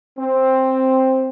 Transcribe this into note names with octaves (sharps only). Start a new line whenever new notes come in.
C4